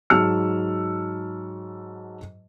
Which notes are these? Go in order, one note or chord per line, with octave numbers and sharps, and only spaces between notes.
G#2 F#3 A5 E6 F6 C#7